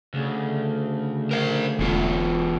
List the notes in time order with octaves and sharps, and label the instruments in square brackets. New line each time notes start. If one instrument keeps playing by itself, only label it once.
[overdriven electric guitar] D2 [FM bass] C#3
[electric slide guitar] A#4 C5 F5
[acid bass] E1 [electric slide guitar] E3 B3 F4